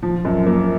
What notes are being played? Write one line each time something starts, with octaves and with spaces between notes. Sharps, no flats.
F3
F#2
A#3